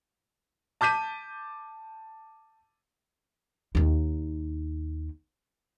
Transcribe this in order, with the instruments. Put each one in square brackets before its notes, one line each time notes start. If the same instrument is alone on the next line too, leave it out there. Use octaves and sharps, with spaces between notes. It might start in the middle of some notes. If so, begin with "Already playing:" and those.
[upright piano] A5 D6 G6 B6 D#7
[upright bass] D#2 D#4